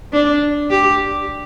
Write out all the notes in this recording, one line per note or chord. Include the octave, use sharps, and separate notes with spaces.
D4
G4